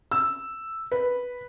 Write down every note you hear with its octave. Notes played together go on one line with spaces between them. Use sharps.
E6
B4